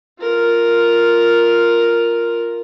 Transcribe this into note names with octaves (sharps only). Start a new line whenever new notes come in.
F4 A#4